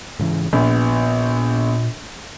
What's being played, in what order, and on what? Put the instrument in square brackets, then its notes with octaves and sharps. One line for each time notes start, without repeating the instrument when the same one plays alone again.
[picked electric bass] G#2 C#3 E3
[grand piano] A#1 [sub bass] A#2 [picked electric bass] B3